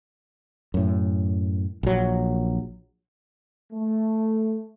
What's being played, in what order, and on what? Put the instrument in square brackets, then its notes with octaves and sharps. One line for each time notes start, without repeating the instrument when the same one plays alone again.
[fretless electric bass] F#2 A2
A#1 F#3
[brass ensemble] A3